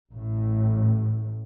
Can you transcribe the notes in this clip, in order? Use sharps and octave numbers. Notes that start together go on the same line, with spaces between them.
A1 A2